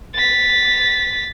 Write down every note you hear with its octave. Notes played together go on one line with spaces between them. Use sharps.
A6 B6